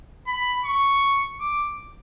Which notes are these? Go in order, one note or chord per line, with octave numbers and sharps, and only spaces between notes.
B5
C#6
D6